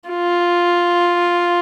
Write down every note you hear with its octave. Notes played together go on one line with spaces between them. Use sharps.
F4